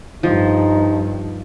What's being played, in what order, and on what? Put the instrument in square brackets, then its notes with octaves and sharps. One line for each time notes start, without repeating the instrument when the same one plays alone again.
[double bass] G2 [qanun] F3 [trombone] D#4